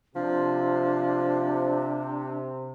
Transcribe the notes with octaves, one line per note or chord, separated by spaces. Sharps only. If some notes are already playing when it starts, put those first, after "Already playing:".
C3 F3 D4